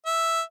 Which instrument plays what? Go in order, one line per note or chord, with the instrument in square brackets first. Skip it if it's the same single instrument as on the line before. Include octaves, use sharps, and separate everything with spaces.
[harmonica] E5